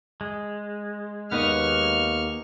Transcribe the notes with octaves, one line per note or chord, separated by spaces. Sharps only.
G#3
D#2 A#3 B3 D#4 D#5 C#6 F6